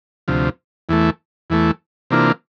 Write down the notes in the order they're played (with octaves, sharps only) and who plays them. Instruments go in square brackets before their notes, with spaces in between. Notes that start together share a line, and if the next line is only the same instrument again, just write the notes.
[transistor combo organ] D2 C3 F3
E2 E3 A3
E2 E3 A3
C3 E3 A#3 D4 F4